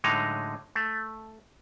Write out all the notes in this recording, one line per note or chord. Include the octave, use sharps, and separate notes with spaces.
A2 D3 F#3 G#3 D#4 A#5
A3